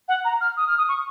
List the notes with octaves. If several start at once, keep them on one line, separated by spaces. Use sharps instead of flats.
F#5
A#5
F6
D#6
F6
D#6
C#6